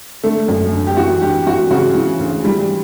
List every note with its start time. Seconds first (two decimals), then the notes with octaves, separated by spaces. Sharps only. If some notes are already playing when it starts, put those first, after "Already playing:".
0.24 D3 A3
0.48 F#2
0.73 D3
0.87 G4
0.97 E3 F#4
1.22 G2 G4
1.47 E3 F#4
1.71 C#3 F#4
1.95 E3
2.19 D2
2.44 E3 G3